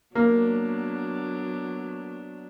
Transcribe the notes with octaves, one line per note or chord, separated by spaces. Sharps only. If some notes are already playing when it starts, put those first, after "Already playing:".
F#3 A#3 B3 D4